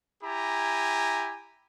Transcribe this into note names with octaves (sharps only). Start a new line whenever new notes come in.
E4 G4 G#5 A#5